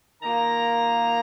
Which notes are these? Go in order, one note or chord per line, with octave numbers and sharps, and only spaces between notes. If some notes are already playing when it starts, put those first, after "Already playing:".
D#3 A#3 F4 A#5